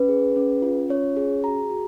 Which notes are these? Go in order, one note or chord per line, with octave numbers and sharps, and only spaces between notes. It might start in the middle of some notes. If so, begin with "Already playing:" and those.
Already playing: C#4 B4
G#4
C#4
F4
C#4 C#5
G#4
F#4 A#5
F#4